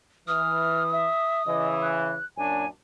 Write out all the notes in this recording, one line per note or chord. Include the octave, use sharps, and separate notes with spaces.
E3 D#6 F6
E5
C#3 E3 D#5
F#6
F#2 A#2 D4 G#5